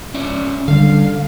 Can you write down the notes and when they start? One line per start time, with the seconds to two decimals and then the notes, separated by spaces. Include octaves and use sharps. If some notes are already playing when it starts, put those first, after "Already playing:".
0.14 C#4 D5 E5
0.68 D3 G3 F5